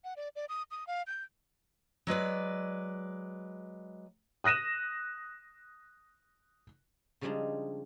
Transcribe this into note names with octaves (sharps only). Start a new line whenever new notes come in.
F#5
D5
D5
D#6
D#6
F5
G6
F#3 G#3 B4 D5
D#6 F#6 A#6 D#7 E7
C#3 F3 G3 G#3 D4 D#4